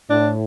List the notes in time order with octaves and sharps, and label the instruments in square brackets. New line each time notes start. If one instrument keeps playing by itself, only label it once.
[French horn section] A2 [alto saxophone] D4